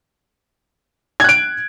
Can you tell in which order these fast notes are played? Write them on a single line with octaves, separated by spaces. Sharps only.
G#6 F#6 D7